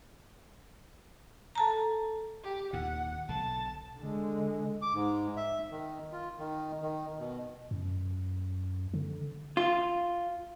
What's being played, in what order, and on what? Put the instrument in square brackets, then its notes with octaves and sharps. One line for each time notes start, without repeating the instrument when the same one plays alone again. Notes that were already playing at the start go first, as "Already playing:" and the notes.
[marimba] A4 A5 A#5
[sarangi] G4
[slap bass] D#2 A#2 [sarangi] F#5
[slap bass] B1 D3 [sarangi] A5
[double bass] D3 G#3
[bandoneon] D6
G#2
E5
D#3
F4
D#3
D#3
B2
[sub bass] F#2
D3
[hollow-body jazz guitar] F4